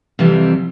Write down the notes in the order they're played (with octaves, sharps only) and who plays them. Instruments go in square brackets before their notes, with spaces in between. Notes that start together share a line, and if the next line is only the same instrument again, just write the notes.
[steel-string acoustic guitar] F2 C3 E3 G3